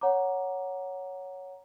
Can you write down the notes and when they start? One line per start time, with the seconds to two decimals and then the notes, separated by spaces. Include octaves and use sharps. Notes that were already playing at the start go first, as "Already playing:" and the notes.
0.01 C#5 F#5 A#5 D6